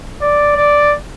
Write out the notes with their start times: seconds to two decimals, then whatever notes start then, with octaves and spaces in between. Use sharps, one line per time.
0.22 D5
0.56 D5